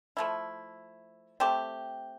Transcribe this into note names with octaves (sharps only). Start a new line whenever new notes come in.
F3 A3 E4
A3 C4 G4